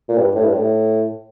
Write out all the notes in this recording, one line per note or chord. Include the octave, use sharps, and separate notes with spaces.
A#2
G2
A2
G2
A2